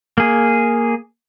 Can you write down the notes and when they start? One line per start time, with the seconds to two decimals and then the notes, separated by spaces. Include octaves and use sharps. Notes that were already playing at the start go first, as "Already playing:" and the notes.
0.18 A#3 G#4